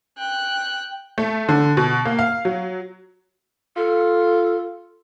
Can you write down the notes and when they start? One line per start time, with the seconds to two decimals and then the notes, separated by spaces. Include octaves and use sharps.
0.18 G5 F#6
1.18 A3
1.49 D3
1.77 B2
2.05 A#3
2.19 F5
2.45 F#3
3.76 F4 A4